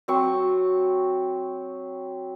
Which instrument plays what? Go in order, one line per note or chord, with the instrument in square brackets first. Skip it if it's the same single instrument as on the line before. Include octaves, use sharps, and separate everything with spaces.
[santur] F#3 C4 C#6